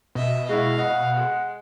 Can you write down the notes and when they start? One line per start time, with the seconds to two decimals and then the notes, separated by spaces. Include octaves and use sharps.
0.15 B2 D#5 E5
0.49 G#3 E4 F#4 F5
0.78 D#5 F#5
1.17 G#3